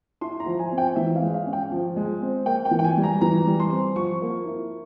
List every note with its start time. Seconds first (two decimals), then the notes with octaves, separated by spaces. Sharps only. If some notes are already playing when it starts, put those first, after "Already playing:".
0.21 E4 C6
0.40 A#5
0.46 F3
0.59 G#5
0.72 C4
0.78 G5
0.96 E3 E5
1.16 F5
1.22 G#3
1.34 F5
1.46 C#4
1.53 G5
1.72 F3
1.96 G#3
2.22 C4
2.46 A#3 G5
2.65 G5
2.71 E3
2.79 G5
2.84 G#5
2.97 G3
3.03 A#5
3.21 E3 A#5
3.47 G3
3.60 C6
3.71 C4
3.96 F3 C#6
4.22 A#3
4.46 E4